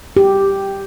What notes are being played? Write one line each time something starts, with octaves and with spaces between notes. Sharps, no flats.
G4